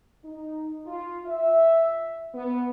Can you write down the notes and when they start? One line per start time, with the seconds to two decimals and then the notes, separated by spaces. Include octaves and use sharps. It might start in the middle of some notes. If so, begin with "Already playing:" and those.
0.24 D#4
0.85 F4
1.26 E5
2.33 B3